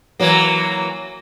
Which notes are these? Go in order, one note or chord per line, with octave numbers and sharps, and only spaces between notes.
E3 F#3 A#3